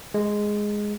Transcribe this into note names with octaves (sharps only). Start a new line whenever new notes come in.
G#3